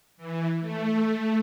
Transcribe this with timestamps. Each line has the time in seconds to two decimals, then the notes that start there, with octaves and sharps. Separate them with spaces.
0.17 E3
0.60 A3